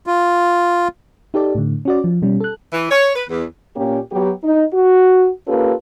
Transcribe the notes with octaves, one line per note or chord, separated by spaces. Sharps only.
F4
D#4 G4 A4 D5
A2 D3
C#4 F#4 D5
F3
B2 G3 C#4
A4 F#6
E3
C#5
B4
E2
A#2 A#3 C#4 G4
F#3 B3 F#4 G4
D#4
F#4
A#3 C#4 F4 G4 A4 B4